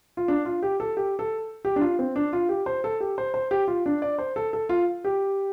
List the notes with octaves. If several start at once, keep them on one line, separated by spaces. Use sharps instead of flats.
F4
D4
F4
G4
A4
G4
A4
G4
D4
F4
C4
D4
F4
G4
C5
A4
G4
C5
C5
G4
F4
D4
D5
C5
A4
A4
F4
G4